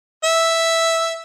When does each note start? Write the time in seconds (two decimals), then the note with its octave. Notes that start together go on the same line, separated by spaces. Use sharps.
0.24 E5